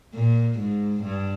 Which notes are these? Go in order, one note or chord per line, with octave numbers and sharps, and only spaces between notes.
A#2
G#2
G2